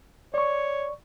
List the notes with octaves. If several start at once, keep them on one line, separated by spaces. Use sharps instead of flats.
C#5 D5 C#6